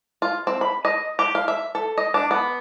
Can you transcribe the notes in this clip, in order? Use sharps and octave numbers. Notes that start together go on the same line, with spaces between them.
F4
C4
B5
D#5
G4
F5
E5
A4
D#5
D4
B3